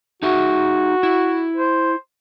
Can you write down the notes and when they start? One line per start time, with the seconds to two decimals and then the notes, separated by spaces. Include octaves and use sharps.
0.23 D#4 F#4 G#4 E5
1.03 E4
1.57 C5